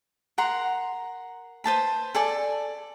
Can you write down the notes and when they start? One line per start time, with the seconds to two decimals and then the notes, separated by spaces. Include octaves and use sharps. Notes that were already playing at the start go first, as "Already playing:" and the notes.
0.38 A#4 F#5 A#5 C6
1.64 B4 C5 A5 B5
2.15 A4 D5 G#5